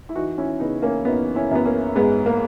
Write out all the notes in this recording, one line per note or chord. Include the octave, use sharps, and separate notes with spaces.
E4
E3 D#4 F#4
C#4 E4
C#3 B3 D#4
A#3 C#4
F#2 B3 D#4
C#4 E4
F#2 B3
A#3 C#4
G#2 G#3 B3
A#3